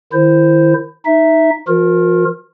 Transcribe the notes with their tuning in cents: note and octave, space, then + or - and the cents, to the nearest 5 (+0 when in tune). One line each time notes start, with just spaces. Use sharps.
D#3 -5 E4 +20 C5 +0
D#4 +0 E5 -5
F3 -40 F4 +45 A#4 +0